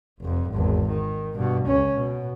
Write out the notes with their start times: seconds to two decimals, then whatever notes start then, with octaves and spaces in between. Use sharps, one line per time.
0.20 F1 F2
0.51 G#1 E2
0.89 D#3
1.36 G2 B2
1.67 C#2 C#4
1.97 B2